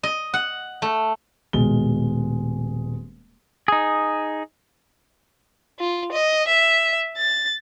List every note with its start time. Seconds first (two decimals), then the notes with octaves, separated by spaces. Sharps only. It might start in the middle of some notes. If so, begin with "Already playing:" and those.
0.03 D#5
0.34 F#5
0.82 A3
1.53 D#1 B2 G#3 G7
3.68 D#4 G#4
5.79 F4
6.12 D#5
6.48 E5
7.17 A6